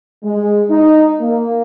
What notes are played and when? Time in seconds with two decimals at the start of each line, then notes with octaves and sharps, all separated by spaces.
0.24 G#3
0.70 D#4
1.19 A#3